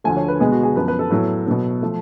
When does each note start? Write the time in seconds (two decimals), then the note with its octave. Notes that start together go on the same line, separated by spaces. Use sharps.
0.04 D2 D3 F3 A3 G#5
0.17 C#5
0.28 B4
0.40 B2 G#3 B3 G#4
0.52 F#4
0.63 G#4
0.76 F#2 F3 B3 B4
0.88 B4
0.99 A4
1.11 A2 F#3 B3 A4
1.47 B2 F#3 B3
1.82 F3 A3